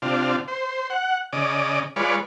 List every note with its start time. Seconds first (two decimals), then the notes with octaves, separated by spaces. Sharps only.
0.02 C3 D4 F4
0.48 C5
0.90 F#5
1.33 C#3 D5 D#5
1.96 G#3 F4 B4 C#5 D5